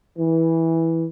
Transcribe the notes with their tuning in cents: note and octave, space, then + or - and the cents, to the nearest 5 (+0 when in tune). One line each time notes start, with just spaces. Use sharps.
E3 -10